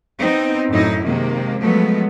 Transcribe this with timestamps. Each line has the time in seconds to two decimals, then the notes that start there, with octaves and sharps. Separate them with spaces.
0.19 B3 C4 D#4
0.69 F#2 A2 F#3 D#4 E4
1.04 C3 D#3 G#3 A#3
1.60 F3 F#3 G#3 A3 B3